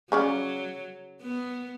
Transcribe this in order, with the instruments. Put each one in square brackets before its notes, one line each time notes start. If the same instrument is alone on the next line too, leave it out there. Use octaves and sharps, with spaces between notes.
[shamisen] C#3 C#4 D5 [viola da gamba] F#3
[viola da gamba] B3